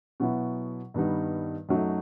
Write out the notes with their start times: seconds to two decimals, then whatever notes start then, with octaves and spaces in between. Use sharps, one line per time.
0.20 B2 F#3 B3 E4
0.94 G2 D#3 G3 B3 D#4
1.69 F#2 F#3 A3 D#4